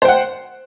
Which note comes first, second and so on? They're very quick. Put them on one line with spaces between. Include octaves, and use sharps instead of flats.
C5 G5 F#5